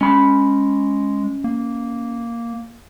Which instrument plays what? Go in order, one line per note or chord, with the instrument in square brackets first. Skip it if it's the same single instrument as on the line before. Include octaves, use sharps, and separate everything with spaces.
[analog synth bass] G#3 [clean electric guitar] C#4 B5
[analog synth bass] A#3